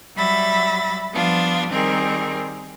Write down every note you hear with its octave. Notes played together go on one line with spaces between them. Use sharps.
F#3 G3 E5 B5 A6 A#6
F3 G3 B3 D4 F4
D#3 G3 C4 G#4 A#4